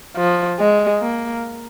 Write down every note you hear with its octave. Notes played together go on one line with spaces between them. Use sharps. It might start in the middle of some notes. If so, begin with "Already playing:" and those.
F3
G#3
A#3